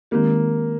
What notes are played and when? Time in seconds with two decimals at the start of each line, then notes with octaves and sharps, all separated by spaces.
0.11 D#3 G#3 A#3 C4 D#4 G4